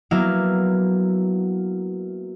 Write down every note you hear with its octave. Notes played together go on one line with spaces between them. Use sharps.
F#3 A#3 B3 E4 E5 F5